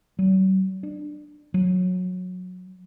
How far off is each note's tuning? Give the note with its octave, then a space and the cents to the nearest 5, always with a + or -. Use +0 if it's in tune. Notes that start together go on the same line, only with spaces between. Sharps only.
F#3 +45
D4 +20
F#3 -20